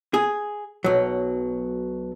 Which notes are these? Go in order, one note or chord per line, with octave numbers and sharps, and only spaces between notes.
G#4
B1 F#3